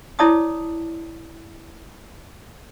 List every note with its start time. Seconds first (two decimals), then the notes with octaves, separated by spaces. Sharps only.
0.19 E4 C#5 D5 A5 D6 D#6